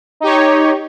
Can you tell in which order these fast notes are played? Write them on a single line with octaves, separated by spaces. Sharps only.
D#4 G4 C#5